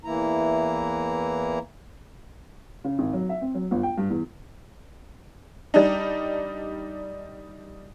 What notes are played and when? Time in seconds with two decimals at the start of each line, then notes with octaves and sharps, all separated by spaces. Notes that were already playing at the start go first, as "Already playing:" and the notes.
0.05 E2 E3 A#3 E4 A#5
2.84 C#3
2.99 G#1
3.13 F#3
3.29 E5
3.42 C4
3.55 F#3
3.71 G1
3.83 G5
3.98 G2
4.10 E2
5.74 G3 D4 D#4